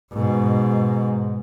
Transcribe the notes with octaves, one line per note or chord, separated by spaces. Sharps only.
G#2 B2